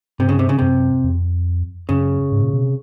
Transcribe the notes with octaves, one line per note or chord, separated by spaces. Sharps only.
G2 C3
C#3
C3
C#3
F#2 C3
F2
F#2 C#3
G#2
A#2
B2
C3